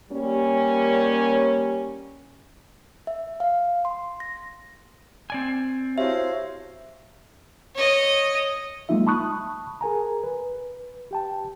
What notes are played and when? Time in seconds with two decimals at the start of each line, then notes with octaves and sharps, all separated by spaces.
0.11 G3 A#3 C#4
3.07 E5
3.40 F5
3.85 C6
4.20 A#6
5.30 C4 D5 G#5
5.98 E4 F#4 G4 C5 C#5 E5 F5
7.75 C#5 D#5
8.89 F#3 G#3 A#3 D#4 F4 E5
9.07 A5 B5 C#6 D#6 F#6
9.81 G#4 A#4 G#5 A#5
10.24 B4
11.11 G4 G5 A5